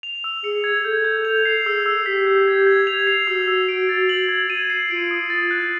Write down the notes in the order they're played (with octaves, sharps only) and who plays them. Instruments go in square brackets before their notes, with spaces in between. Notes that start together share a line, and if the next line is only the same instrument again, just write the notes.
[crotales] F7
E6
[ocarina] G#4 [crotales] C#7
[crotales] G#6
[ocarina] A4 [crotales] G6
[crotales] G6
F7
C7
[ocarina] G#4 [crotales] E6
[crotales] E6
[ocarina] G4 [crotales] B6
[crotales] G6
G#6
G#6
F7
C7
[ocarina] F#4 [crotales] E6
[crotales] E6
D7
A6
F#7
G#6
D#7
C7
[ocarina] F4 [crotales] D7
[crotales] D#6
[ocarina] F4 [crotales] A6
[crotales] F#6